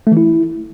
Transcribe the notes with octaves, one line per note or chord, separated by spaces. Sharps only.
A3
E3
E4